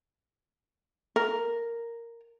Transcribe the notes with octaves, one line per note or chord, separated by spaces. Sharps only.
A#4